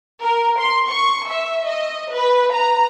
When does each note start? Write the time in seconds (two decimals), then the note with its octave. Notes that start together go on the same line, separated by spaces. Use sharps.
0.22 A#4
0.59 C6
0.90 C#6
1.30 E5
1.68 D#5
2.12 B4
2.54 A#5